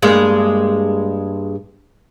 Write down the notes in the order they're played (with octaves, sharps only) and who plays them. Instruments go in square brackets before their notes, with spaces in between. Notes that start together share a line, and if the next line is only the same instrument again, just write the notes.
[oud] G2 G#3 A#3